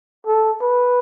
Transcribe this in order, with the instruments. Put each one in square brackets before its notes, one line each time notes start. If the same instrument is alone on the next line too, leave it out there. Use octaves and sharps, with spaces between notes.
[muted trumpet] A4
B4